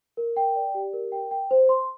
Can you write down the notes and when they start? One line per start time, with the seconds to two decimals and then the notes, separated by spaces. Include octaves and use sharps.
0.17 A#4
0.37 G5
0.56 D5
0.74 G4
0.93 A#4
1.12 G5
1.31 G5
1.51 C5
1.69 C6